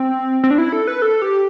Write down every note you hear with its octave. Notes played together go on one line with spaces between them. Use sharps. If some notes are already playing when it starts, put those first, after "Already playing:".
Already playing: C4
C4
D4
E4
A4
B4
A4
G4